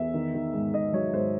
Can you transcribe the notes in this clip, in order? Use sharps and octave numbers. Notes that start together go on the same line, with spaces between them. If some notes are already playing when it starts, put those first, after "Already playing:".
Already playing: E2 E5
D#3
D#3
G#2
G#2 D#5
F#3 C#5
G#2 C5